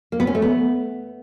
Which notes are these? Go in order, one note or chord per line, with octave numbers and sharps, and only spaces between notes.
A#3
B3
C#4
A3
B3